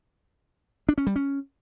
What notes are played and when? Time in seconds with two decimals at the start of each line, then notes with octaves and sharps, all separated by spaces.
0.89 D4
0.98 C#4
1.07 G3
1.16 C#4